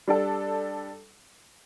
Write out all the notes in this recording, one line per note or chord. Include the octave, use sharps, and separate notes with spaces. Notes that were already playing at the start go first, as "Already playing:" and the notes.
G3 D4 A4